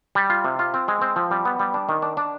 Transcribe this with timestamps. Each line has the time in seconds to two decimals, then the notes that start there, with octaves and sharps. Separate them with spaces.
0.15 G3
0.30 F4
0.44 C3
0.59 F4
0.74 C4
0.88 G#3
1.01 C4
1.16 F3
1.31 G3
1.45 B3
1.59 G3
1.74 D4
1.89 D#3
2.02 D4
2.17 D4